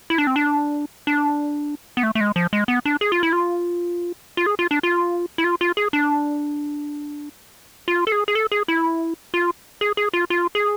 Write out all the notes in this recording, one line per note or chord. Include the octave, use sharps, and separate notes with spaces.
E4
D4
C4
D4
D4
B3
A3
A3
G#3
F3
G#3
B3
D4
G#4
F4
E4
F4
F4
G#4
F4
D4
F4
E4
F4
F4
G#4
D4
F4
A4
G#4
G#4
A4
G#4
E4
F4
G#4
G#4
F4
F4
G#4